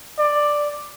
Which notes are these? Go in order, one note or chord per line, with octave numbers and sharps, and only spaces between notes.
D5